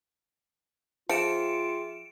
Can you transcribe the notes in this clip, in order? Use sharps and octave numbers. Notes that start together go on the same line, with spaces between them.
F3 F4 G#4 E5 G5 C#7 D7 E7